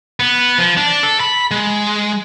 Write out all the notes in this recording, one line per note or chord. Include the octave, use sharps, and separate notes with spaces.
B3
F3
D4
A4
B5
G#3